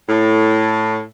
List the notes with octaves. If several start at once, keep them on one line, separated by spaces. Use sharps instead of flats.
A2